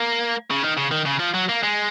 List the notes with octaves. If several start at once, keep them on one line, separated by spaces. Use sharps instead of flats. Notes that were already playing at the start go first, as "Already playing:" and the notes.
Already playing: A#3
C#3
D#3
C#3
D#3
C#3
F3
F#3
A#3
G#3